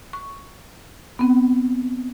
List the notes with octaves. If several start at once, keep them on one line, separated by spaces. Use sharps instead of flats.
C#6
B3 C4